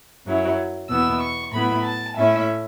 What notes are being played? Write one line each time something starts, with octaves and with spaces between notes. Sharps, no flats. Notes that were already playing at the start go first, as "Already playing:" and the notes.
F#2 F#3 C#4 E4
E2 B2 B3 E4 E6
C#6
A2 F#3 B3 E4 B5
A5
A2 A3 C#4 E4 E5